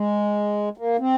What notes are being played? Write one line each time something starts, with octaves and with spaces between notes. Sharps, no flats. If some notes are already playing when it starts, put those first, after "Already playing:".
Already playing: G#3
A#3
C4